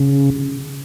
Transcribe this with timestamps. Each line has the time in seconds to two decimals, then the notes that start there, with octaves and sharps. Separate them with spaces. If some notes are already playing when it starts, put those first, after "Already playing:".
Already playing: C#3